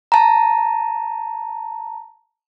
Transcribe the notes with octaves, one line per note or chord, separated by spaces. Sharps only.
A5 A#5